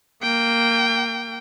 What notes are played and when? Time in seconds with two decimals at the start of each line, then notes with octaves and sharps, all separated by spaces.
0.22 A#3 G5